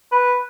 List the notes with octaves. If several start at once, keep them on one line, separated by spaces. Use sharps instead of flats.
B4